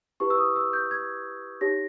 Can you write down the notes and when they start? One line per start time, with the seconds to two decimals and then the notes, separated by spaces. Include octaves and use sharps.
0.20 E4 G4 B4 C#6
0.30 E6
0.38 D#6
0.56 E6
0.73 G6
0.91 G#6
1.61 D#4 G4 C#5 A#6